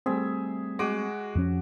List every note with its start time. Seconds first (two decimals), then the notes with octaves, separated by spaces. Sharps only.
0.06 G3 A3 C4 G#4 E5
0.79 G#3 F#4 D6
1.35 F2 F3 C#4